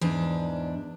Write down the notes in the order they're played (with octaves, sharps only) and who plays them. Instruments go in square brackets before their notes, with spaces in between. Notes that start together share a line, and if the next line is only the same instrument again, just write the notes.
[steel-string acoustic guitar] E2 G#2 D4